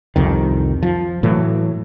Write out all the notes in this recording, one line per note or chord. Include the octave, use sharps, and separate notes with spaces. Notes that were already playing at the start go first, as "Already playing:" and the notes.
C2 F2 D#3
F3
A2 E3 F#3